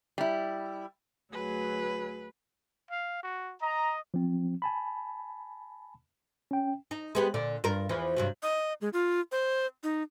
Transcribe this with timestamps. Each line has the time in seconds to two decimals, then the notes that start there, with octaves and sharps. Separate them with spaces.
0.18 G3 E4
1.32 D2 F#3 G#4 B4
2.91 F5
3.23 F#4
3.62 D#5 A#5
4.14 F3 C4
4.62 G#5 A5 B5
6.51 C#4 G5
6.91 D#4
7.15 G#3 B3 G4
7.34 A#2 D3 D5
7.64 G2 F4 A#4
7.89 E2 E3 F3
8.17 G2 C3 F#3
8.42 D#5
8.81 G#3
8.93 F4
9.32 C5
9.83 D#4